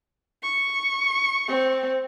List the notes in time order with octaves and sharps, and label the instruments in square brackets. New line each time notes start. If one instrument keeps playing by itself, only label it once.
[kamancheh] C#6
[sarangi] C4